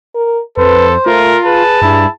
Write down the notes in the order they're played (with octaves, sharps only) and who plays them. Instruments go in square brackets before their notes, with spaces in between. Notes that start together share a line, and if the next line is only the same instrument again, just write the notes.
[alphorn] A#4
[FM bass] F2 [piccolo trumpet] A4 [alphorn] B4 [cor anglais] C5
[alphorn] A3 [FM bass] F4 [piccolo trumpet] A#4
[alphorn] G#4 [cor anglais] B4 [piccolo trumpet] A5
[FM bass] G2 [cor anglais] E4